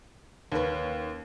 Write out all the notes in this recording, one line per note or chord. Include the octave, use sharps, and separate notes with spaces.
D#2 C#4 B4